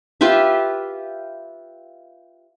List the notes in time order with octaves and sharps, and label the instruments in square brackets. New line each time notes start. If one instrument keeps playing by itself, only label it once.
[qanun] F4 G4 B4 E5